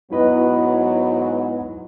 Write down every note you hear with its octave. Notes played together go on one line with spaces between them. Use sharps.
G#2 F#3 B3 E4 B4 D#5